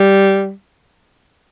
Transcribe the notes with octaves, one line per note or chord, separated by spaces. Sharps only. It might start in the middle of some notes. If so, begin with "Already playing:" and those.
Already playing: G3